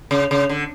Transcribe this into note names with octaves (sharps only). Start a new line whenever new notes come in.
C#3
C#3
D3